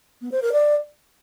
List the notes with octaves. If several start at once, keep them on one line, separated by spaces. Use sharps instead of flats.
B3
C5
A#4
D5